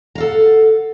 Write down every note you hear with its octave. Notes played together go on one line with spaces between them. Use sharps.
A4 F5 F#5 A#5